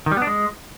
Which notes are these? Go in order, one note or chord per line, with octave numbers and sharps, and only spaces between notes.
D#3
G3
B3
D4
G#3